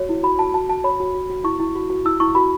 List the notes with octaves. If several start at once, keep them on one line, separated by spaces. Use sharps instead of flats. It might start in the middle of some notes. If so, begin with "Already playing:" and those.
Already playing: F#4 C#5
E4
F#4 B5
F#4 A5
F#4 A5
F#4 A5
C#5 B5
F#4
F#4
F#4
E4 C#6
E4
F#4
F#4
E4 E6
E4 C#6
F#4 B5